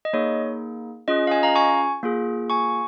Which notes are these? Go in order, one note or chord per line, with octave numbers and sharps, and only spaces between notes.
D#5
A#3 D#4 G#4 C#5
C#4 F4 G#4 D#5
F5
D#5 G#5
F5 A#5
G#5 C#6
A#3 F4 G#4
G#5 C#6